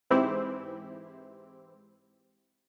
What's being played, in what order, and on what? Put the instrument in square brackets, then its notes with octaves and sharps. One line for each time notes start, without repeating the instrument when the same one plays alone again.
[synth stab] G#2 E3 C4 E4 G4